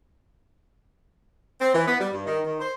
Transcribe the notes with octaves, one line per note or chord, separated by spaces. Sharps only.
C4
E3
B3
G3
G2
D#3
D#3
C5